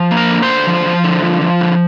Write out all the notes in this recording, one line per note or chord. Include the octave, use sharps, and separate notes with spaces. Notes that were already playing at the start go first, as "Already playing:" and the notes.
Already playing: F3
A#3
A#4
D3
C5
D3
F3
F3
D3
F3
F3
D3